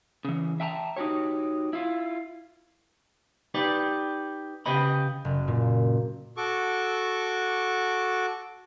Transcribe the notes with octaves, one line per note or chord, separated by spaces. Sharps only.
C#3 E3
E5 G5 A5 A#5
D#4 F#4 G4 C#5
E4 F4
D#4 G4 B4 D5
C#3 G4 B4 D#5 B5
F#1
A#2
F#4 A4 C#6 D6